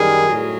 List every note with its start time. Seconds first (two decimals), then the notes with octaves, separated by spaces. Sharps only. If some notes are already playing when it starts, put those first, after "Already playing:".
Already playing: F#2 D#3 G3 G#4
0.29 A2 F#3